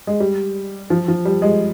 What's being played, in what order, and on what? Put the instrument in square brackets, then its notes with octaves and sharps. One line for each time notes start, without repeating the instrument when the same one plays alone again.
[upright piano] G#3
G3
F3
F3
G3
G#3